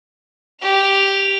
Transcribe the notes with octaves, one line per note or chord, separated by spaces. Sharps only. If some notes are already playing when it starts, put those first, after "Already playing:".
G4 F7